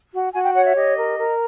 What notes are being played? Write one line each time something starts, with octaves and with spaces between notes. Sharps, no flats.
F#4
F#4 G#5
G5
C#5 F#5
E5
G4 D#5
A#4
A#4